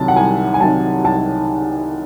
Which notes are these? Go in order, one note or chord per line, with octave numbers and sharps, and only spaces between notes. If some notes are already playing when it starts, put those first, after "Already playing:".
Already playing: C2 C3 D#3 F#3 A5
F#5
C2 G#5
G#5
C3 D#3 F#3 A5
C2 A5